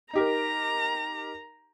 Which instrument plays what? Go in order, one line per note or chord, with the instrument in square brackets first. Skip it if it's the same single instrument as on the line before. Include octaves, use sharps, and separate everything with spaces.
[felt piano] D#4 G4 A#4 [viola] A#5